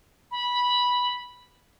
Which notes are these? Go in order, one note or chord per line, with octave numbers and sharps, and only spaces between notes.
B5